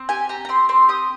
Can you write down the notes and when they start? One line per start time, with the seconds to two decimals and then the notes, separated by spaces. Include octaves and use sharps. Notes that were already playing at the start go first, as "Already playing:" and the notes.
Already playing: C4
0.09 G4 G#5
0.29 G4 A#5
0.45 A#5
0.49 C4 C6
0.69 C4 C6
0.89 G4 D#6